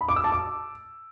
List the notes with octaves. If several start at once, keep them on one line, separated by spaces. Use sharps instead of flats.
B5
D6
E6
A5
D6